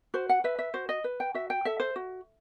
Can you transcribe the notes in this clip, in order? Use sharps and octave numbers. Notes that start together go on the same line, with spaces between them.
F#4 C5
F#5
B4 E5
E5
F#4 C5
D#5
B4
G5
F#4 E5
G5
A4 E5
C5
F#4